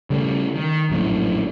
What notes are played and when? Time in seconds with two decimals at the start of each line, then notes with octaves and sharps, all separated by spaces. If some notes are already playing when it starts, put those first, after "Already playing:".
0.10 C#3 G3 A3
0.55 D#3
0.90 A#1 F#2 A2